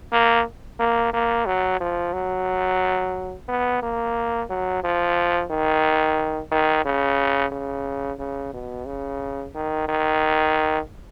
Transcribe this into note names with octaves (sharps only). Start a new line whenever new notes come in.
A#3
A#3
A#3
F#3
F3
F#3
B3
A#3
F#3
F3
D#3
D#3
C#3
C#3
C#3
B2
C#3
D#3
D#3